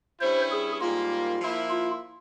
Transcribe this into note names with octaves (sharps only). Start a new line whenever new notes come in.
G2 G3 C#4 E4 C5
G#4
G#2 G3 A#3 F4
F3 A#3 E4
F4